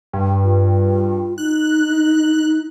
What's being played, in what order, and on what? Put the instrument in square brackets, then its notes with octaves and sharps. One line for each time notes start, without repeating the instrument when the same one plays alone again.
[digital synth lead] G2
[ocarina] F4
[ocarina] D#4 [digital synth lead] F#6